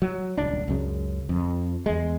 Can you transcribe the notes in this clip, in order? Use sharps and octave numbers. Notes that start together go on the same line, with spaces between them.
F#3
D#1 C#2 D4
C#2 F#2 C#3
F2
E2 G#3